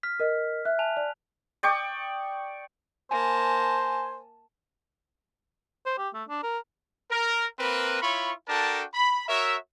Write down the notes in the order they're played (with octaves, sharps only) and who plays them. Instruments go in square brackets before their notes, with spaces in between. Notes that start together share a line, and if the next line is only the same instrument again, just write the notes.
[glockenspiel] F6 B6
[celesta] A#4 D#5
[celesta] E5 [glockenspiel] F#6
[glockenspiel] G#5 A5 F7
[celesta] D5
[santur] D5 G5 C#6 D#6
[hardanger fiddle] A#3 A5 [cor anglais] C5 [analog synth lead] G#5
[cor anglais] C5
G4
A3
D4
A#4
[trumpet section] A#4
A#3 C4 A#4 B4
E4 F4 C#5 B5 C#6
D4 F#4 A4 A#4 G5 A5
B5
F#4 A#4 C#5 E5